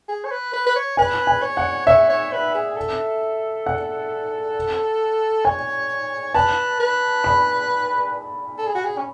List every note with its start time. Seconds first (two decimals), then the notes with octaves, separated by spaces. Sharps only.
0.08 G#4
0.25 C#5
0.31 B4
0.53 B4
0.66 B4
0.76 C#5
0.97 B4 G#5
1.27 G#5
1.42 C#5
1.57 F#5
1.87 C#5 E5
2.09 C#5
2.32 B4
2.54 G#4
2.77 A4
3.66 F#5
5.45 C#5 G#5
6.34 B4 A5
6.80 B4
7.24 B5
8.58 A4
8.67 G#4
8.75 F#4
8.84 G#4
8.98 C#4